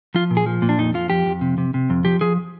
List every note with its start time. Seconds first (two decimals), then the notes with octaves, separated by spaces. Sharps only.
0.15 F3 F4
0.31 A#2
0.37 G#4
0.46 F3
0.62 A#2
0.69 D4
0.78 F2 D#4
0.94 F3 F4
1.10 F2 G4
1.26 F2
1.41 C3
1.58 C3
1.74 C3
1.90 F2
2.05 F3 G4
2.21 F3 G#4